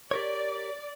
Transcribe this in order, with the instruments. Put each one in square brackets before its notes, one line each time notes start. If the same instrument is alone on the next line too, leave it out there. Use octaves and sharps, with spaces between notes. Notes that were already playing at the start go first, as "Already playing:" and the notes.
[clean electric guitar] G4 A#4 C#5 [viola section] D5